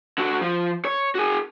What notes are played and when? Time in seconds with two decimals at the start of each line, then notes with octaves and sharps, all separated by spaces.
0.18 D3 F#4
0.42 F3
0.85 C#5
1.15 F#4 G#4